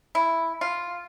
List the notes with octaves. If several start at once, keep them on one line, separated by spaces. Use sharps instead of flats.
E4
F4